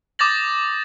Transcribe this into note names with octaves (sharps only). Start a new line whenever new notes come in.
D6 D#6 G6 A6 A#6 F#7